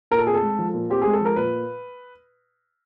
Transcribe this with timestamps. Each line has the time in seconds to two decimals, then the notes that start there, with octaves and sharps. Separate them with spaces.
0.11 A#2 A#4
0.19 A4
0.27 C4 G#4
0.34 A4
0.42 G#3
0.59 F3
0.74 A#2
0.90 C4 G4
1.02 G#3 G#4
1.13 A4
1.21 F3 A#4
1.36 A#2 B4